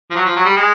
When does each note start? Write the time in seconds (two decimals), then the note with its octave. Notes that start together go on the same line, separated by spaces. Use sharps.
0.11 F3
0.16 F#3
0.25 F3
0.36 F#3
0.46 G3
0.57 G#3